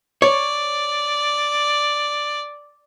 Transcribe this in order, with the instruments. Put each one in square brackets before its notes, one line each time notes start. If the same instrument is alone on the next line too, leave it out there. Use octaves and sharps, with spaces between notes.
[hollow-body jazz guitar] C#5 [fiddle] D5